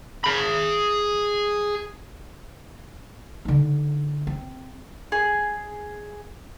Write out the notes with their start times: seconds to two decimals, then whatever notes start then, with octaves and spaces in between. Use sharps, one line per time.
0.24 G#4 B5
3.45 D3 D#4
4.27 C4
5.12 G#4